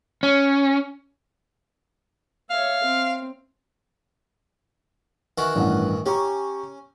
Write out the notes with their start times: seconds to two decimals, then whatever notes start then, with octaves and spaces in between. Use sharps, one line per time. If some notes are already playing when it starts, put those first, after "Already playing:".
0.23 C#4
2.50 C#5 E5 F5
2.85 C4
5.38 D#3 E3 F#4
5.55 A1 G2 F#5
6.06 C#4 G4 A#5 C#6